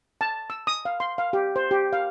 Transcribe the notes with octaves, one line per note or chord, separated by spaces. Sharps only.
A5
E6
D#6
F5
C6
F5
G4
C5
G4
F5